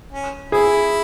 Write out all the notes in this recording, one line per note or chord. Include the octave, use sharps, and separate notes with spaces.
C#4
E4 G#4